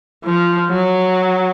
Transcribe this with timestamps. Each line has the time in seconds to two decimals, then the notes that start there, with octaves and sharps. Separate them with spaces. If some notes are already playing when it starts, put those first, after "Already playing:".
0.24 F3
0.70 F#3